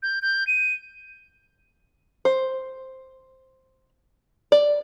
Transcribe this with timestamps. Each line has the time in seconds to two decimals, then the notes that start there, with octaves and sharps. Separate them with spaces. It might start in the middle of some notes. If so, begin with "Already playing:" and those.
0.03 G6
0.22 G6
0.47 D#7
2.25 C5
4.52 D5